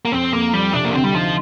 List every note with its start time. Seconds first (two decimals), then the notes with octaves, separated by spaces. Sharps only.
0.05 A#3
0.12 F2 C4
0.32 F2 A#3
0.53 F3 G3
0.73 C3 D4
0.85 A#3
0.93 D2 C4
1.04 G3
1.14 F3 D#4